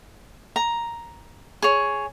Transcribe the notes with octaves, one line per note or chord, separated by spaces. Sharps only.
A#5
G#4 C#5